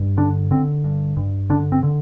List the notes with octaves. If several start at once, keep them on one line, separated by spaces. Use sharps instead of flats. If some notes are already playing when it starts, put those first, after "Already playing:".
Already playing: G2
D3 D4
D3 C4
G2
G2
D3 D4
C4
D3